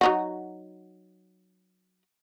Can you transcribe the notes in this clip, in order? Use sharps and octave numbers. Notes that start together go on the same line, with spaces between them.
F#3 D#4 F#4